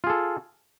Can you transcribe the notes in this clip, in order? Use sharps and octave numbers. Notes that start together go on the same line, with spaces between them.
F4 G#4 A4